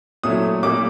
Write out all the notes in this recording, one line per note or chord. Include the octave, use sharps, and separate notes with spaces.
A#2 F#3 A3 C#4 E4 D#6
A#2 G3 A#3 D6